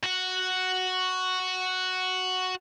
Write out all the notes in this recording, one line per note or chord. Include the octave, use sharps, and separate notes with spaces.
F#4 F#5